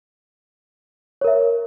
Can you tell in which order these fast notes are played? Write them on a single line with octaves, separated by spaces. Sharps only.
C#5 A#4 E5